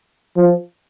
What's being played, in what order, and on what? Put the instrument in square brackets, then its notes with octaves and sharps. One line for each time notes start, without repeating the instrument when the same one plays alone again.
[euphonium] F3